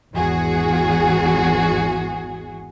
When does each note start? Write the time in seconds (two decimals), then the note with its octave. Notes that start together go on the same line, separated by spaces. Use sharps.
0.14 G#1 E2 F#4 G#4